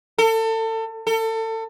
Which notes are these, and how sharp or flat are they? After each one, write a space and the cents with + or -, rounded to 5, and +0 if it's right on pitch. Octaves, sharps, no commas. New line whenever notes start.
A4 +30
A4 +30